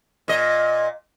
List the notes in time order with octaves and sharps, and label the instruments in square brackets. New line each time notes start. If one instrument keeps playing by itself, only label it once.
[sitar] A#2 D#5